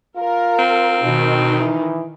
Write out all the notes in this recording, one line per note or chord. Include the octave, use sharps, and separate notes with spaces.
F4 A#4
C4
B2 D#3 D#4
E3